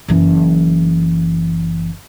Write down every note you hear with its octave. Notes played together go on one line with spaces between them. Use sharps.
F#1 E3